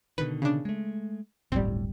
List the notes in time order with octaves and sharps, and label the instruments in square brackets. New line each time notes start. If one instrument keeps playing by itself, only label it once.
[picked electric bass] B2 D3 D#3 [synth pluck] B4
[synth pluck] C#3 D4
[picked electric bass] G#3 A3
[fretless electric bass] D1 G1 G3 [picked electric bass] A2 [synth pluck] C4